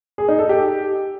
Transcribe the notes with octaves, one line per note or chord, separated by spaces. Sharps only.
G#4
D#4
A4
G4